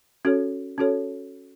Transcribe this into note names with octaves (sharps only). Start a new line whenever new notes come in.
C#4 F#4 A4 C#5
C#4 F#4 A4 C#5